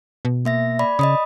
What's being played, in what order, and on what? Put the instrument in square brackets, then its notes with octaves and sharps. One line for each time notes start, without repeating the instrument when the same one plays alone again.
[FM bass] B2
[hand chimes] A#3 E5 A#6
D5 B5
[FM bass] C#3 [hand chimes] D#5 B5 D#6